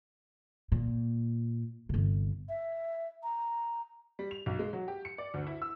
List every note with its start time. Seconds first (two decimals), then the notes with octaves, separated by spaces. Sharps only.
0.72 A#2
1.89 G1 C3
2.49 E5
3.23 A#5
4.19 G3
4.31 F7
4.46 B1
4.59 G#3
4.73 F#3
4.88 G4
5.05 C#7
5.18 D5
5.34 D2
5.47 E4
5.62 E6